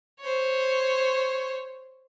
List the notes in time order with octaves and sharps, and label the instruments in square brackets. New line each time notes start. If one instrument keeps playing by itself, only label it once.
[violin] C5 C#5